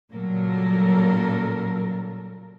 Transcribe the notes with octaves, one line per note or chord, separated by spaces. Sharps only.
A#2 C#3 F#3 G3 A4 A#4